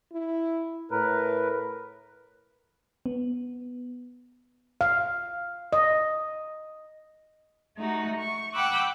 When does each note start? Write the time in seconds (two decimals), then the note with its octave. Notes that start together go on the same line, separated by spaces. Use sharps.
0.12 E4
0.91 A2 A#4 B4
3.06 B3
4.81 F5
5.73 D#5
7.77 A3 D#4 F#4
8.17 C#6
8.53 F#5 G5 B5 D6 E6 F#6